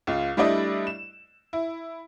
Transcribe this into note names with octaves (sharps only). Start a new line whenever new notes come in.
C#2 F4
G3 A3 D4 E4 D5 D#5
E7
E4